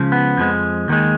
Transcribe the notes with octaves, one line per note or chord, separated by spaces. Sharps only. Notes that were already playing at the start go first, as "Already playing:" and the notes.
Already playing: C#2 C#3 F3
B3
F2 F3 G#3
D#2 D#3 G#3